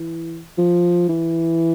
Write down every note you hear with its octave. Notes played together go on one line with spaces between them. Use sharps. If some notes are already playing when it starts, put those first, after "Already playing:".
Already playing: E3
F3
E3